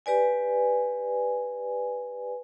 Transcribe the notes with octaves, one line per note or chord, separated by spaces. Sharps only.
G4 B4 D5 G#5